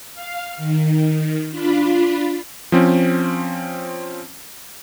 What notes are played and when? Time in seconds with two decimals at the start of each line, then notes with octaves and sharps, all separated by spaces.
0.14 F5
0.57 D#3
1.51 D4 F4 B5
2.72 F3 C4 C#4